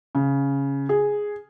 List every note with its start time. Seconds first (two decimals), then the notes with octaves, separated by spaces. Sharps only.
0.15 C#3
0.89 G#4